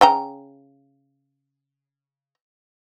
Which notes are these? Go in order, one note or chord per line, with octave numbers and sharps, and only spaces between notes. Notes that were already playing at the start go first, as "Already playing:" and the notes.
C#3 G5 A#5